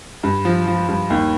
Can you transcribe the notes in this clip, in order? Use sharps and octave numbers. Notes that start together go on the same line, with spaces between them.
G2
F3
F3
G2
D#2